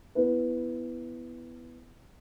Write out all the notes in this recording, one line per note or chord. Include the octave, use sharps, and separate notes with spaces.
B3 E4 B4